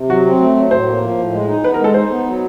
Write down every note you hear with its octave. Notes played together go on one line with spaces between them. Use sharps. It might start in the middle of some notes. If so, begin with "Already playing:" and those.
Already playing: C3
F#3 F#4
C4
A3
F#3
A2 C5
A#3
F3
A2
G#3
D#4
B3 B4
A#4
G#3 A4
D#4 C5
B3
F#3